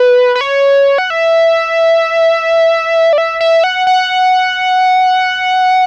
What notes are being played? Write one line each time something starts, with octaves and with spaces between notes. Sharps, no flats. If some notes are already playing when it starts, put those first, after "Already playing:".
Already playing: B4
B4
C#5
F#5
E5
D5
E5
E5
F#5
F#5